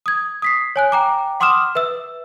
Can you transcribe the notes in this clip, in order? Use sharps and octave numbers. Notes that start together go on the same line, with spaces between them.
D#6 G#6
D#6 B6 C7
C#5 G#5 F#6
G5 A#5 D6
F#5 C6 D6 D#6 F6 E7
B4 E5 E6